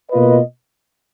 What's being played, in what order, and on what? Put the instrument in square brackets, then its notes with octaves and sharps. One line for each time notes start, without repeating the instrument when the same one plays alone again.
[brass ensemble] B2 A#3 F4 B4 D#5